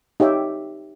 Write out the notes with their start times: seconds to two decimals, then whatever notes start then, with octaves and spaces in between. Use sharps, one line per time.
0.20 D#4 G4 C#5 E5 G5